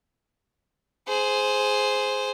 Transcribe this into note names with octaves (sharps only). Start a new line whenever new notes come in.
G#4 C5